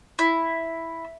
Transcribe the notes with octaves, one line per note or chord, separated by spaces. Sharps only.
E4